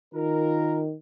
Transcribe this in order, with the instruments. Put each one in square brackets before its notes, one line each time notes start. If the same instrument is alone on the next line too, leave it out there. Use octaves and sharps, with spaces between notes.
[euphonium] D#3 [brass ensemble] F4 A#4